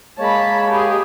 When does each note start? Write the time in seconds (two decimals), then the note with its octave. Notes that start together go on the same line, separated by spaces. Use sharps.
0.19 G#3 A#3 C#5 A5 B5
0.70 G4 G#4